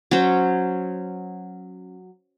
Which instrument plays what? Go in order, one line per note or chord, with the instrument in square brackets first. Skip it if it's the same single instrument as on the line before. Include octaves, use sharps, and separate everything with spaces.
[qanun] F#3 C#4 C5